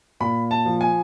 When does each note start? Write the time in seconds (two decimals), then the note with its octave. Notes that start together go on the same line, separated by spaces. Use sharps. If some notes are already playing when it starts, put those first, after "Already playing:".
0.20 A#2 B5
0.51 A5
0.65 F3
0.81 G#5